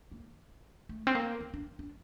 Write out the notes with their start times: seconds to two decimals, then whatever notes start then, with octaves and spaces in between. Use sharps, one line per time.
0.12 A#3
0.89 A3
1.07 C4
1.15 A#3
1.41 C4
1.54 D4
1.79 D4